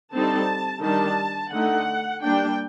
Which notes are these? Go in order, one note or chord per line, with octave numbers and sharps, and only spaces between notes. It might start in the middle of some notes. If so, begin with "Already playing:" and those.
D3 G3 C4 D#4 A5
D#3 G3 D4 A5
D3 A3 D#4 F#5
G3 A#3 D4 G5